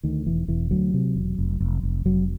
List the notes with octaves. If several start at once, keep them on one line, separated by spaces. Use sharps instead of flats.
D2 D#3
E1 E3
E1 E3
D2 F#3
C3
E1
F1
F1
F1
F1 F#3